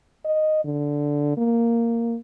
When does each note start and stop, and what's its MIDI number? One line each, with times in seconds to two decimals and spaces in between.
0.25 0.61 75
0.64 1.37 50
1.37 2.17 58